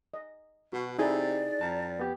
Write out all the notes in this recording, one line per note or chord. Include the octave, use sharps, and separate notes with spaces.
D#5
B2 F#4
C3 D#4 E4 G#4 A4 D5 D#5
F2 A5 A#5
B3 G4